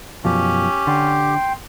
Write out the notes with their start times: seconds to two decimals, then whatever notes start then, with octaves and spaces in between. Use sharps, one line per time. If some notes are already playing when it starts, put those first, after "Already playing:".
0.25 F#2 B2 F3 C#4 G4
0.87 D3 G5 C6